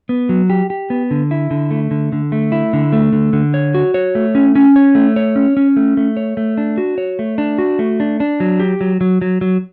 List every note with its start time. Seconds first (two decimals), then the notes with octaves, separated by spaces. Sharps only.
0.09 B3
0.29 F#3
0.50 G4
0.70 G4
0.90 B3
1.11 D3
1.31 E4
1.51 D3
1.71 A3
1.91 D3
2.12 D3
2.32 A3
2.52 E4
2.73 D3
2.93 A3
3.13 D3
3.33 D3
3.54 C#5
3.75 F#4
3.94 C#5
4.15 A3
4.35 C#4
4.55 C#4
4.76 C#5
4.95 A3
5.16 C#5
5.36 C#4
5.57 C#4
5.77 A3
5.97 A3
6.17 C#5
6.37 A3
6.58 D4
6.78 F#4
6.98 C#5
7.19 A3
7.38 D4
7.58 F#4
7.79 A3
8.00 D4
8.20 D4
8.40 F#3
8.60 G4
8.81 F#3
9.01 F#3
9.22 F#3
9.41 F#3